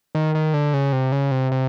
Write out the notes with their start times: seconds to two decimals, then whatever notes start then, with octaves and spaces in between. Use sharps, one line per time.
0.15 D#3
0.35 D#3
0.54 D3
0.74 C#3
0.93 C3
1.12 C#3
1.31 C3
1.52 C3